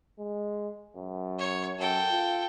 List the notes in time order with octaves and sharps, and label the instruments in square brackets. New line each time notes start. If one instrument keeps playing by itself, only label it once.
[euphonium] G#3
F#2
[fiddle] C#5
[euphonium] F#2 [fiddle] A4 G5
[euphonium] F4